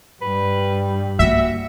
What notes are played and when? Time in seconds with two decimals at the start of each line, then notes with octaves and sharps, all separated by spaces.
0.22 G2 G3 B4
1.19 A#3 D#4 F#4 E5